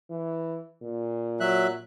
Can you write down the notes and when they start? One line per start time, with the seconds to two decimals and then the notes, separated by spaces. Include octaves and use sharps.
0.10 E3
0.82 A#2
1.40 F#3 E5 F#6